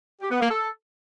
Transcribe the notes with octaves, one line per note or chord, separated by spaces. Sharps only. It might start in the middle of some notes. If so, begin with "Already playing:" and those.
G4
B3
A#3
A4